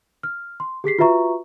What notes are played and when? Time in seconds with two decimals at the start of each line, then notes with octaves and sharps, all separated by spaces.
0.23 F6
0.60 C6
0.84 G4 G#4 B6 C7
0.99 F4 F#4 B4 E5 A#5 C#6